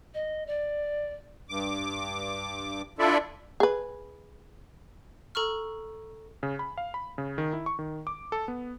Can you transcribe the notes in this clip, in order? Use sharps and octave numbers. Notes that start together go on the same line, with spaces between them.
D#5
D5
G2 D6
D4 E4 F4 A4 D5 E5
G#4 B4
A4 A#5 C#6 F6
C#3
B5
F5
B5
C#3
D#3
E4
C#6
D#3
D6
A4
B3